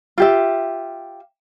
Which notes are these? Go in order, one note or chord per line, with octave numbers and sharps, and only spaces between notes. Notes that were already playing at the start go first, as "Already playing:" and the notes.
F4 G4 E5